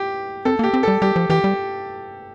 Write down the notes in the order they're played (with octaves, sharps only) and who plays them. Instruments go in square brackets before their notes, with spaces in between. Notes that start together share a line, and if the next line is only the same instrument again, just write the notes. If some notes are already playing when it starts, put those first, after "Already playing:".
Already playing: [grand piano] G4
[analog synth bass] C4 [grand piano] A4
[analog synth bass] A#3 [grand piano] G4
[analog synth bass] C4
[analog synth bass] G3 [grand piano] A4
[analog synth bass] G3 [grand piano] G4
[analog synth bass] F3
[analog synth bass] E3 [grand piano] G4
[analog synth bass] G3